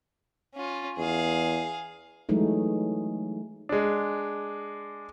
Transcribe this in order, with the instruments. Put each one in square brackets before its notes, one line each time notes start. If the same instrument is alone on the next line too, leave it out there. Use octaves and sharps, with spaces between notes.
[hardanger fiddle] C#4 F4
[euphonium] E2 [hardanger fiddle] G#4 F5
[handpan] E3 F#3 G#3 A3 D#4
[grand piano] G#3 D4